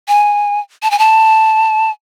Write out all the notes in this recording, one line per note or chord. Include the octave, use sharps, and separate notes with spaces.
G#5
A5
G#5
A5